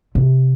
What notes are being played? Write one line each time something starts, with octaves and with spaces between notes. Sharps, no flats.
C3